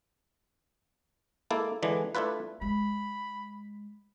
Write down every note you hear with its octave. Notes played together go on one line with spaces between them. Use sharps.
G#3 A#3 E4 A4
D3 E3 G#3 D4
A3 D4 E4 F4 B4
G#3 B5